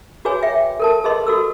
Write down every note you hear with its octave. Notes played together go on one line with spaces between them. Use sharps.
F#4 G#4 B4 C#5 G#5
E5 G5
A4 A#4 A5
G#4 B4 D#5 C6
F#4 A4 E6